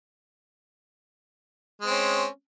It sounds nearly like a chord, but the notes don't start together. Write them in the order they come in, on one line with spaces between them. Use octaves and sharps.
G#3 C4 C#4